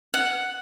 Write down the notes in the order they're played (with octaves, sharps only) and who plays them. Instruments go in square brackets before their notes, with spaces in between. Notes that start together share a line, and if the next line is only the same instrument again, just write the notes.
[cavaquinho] F#5